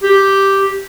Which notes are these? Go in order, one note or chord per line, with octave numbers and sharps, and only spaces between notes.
G4